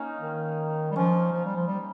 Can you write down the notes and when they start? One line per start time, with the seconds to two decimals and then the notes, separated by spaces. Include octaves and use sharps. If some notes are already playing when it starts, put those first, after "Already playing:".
Already playing: A#3 C#4 D#4
0.20 D#3
0.91 G3
0.96 F3 C#4
1.33 F3
1.45 G3
1.56 F3
1.67 G3